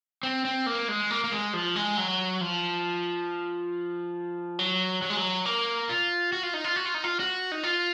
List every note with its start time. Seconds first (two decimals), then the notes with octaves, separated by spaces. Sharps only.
0.23 C4
0.45 C4
0.66 A#3
0.88 G#3
1.11 A#3
1.24 A#3
1.32 G#3
1.53 F3
1.76 G#3
1.97 F#3
2.41 F3
4.59 F#3
5.02 F#3
5.10 G#3
5.17 F#3
5.46 A#3
5.89 F4
6.32 F#4
6.43 F4
6.54 D#4
6.64 F4
6.76 F#4
6.85 F4
6.94 D#4
7.04 F4
7.20 F#4
7.52 D#4
7.63 F4